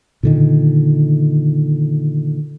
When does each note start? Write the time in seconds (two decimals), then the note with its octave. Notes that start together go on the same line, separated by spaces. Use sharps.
0.23 A#2 D3 D#3